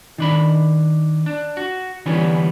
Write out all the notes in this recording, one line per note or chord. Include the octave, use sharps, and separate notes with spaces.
D#3 D4 B5
D4
F#4
D3 E3 G3 B3 C#4